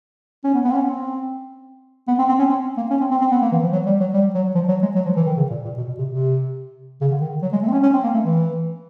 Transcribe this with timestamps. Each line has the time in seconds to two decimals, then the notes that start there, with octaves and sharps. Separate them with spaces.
0.44 C#4
0.54 B3
0.64 B3
0.70 C4
0.75 C#4
0.85 C4
2.08 B3
2.19 C4
2.29 C4
2.39 C#4
2.50 C4
2.77 A#3
2.90 C#4
3.00 C4
3.11 C4
3.21 C4
3.31 B3
3.42 A#3
3.52 E3
3.63 F3
3.72 F#3
3.86 G3
4.00 F#3
4.13 G3
4.34 F#3
4.55 F3
4.68 F#3
4.82 G#3
4.95 F#3
5.06 F3
5.16 E3
5.26 D#3
5.37 C#3
5.50 A#2
5.65 A#2
5.77 B2
5.88 B2
5.98 C3
6.09 C3
7.01 C#3
7.11 D3
7.21 D#3
7.42 F#3
7.52 G#3
7.62 A3
7.68 C4
7.73 C#4
7.83 C#4
7.93 C4
8.03 A#3
8.14 A3
8.24 E3